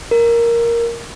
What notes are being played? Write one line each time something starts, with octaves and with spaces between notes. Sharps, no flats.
A#4